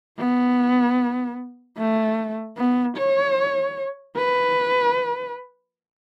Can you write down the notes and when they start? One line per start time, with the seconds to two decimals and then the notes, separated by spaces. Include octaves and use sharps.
0.18 B3
1.77 A3
2.57 B3
2.97 C#5
4.17 B4